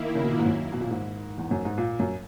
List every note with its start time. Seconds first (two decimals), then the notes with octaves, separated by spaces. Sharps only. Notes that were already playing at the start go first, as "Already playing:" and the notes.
Already playing: D#3 A#3 E4
0.15 C#3
0.23 B2
0.31 A#2
0.39 G#2
0.46 F#2
0.72 B2
0.81 A#2
0.90 G#2
1.38 E2
1.51 F#2
1.65 G#2
1.78 A#2
1.99 F#2